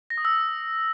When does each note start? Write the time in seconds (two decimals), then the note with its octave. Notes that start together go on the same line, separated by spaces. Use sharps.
0.10 A#6
0.18 D#6
0.25 E6